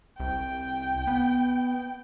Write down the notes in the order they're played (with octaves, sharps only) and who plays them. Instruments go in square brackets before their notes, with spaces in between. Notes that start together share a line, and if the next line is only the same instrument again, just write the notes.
[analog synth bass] C2 [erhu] G5
[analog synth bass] B3